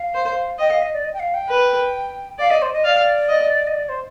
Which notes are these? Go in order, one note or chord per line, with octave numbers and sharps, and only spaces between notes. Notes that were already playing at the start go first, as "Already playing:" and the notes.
Already playing: F5
C5
D#5 G5
F5
D#5
D5
D#5
G5
F5
G5
B4
D5 F5
D#5
C5
D#5
D5 F5
D#5
D#5
D5
C5